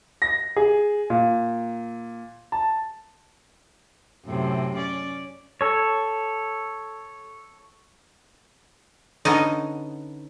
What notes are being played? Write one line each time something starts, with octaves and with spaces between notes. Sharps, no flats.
A#6
G#4
A#2
A5
F#2 A2 C3
C#4 D5
A4 C#5
D3 B3 C#4 D#4